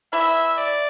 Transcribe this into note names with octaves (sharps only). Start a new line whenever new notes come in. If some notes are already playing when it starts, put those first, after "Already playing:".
E3 E4 E5
D5